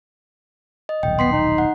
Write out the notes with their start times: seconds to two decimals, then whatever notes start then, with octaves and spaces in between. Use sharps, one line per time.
0.89 D#5
1.03 D#1 B1 G5
1.19 B3 C6 B6 C7
1.32 D#4
1.58 F#5